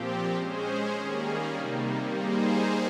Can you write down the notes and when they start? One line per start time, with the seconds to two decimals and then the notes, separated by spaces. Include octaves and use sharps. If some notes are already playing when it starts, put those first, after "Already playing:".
Already playing: A#2 F3 C4 G4
0.34 G#3 C#4 G#4 C5
0.95 D#3 G3 A#3 C#4 G#4
1.54 C3 D#3 G3 A#3
2.15 G3 A#3 D#4 G#4 C5